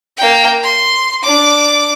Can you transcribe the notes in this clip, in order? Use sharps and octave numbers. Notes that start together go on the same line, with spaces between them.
A#3 G5
C6
D4 D6